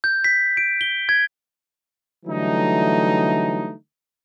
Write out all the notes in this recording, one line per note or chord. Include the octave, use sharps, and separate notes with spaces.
G6
B6
D7
G7
G#6
D3 E3 F#3 G3 A3 D#4